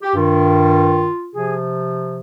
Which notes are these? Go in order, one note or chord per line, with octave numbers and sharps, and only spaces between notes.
G4
G2 D#3 F4
C3 F3 G#4